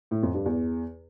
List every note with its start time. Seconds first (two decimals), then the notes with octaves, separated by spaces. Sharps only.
0.11 A2
0.23 F2
0.34 G2
0.46 E2